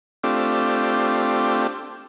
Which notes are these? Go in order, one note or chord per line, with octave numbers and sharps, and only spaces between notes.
A3 C4 D4 F4 G4